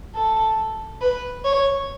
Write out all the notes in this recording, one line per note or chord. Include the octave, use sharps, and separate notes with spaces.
A4
B4
C#5